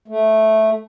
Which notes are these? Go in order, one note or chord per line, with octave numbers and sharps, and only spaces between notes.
A3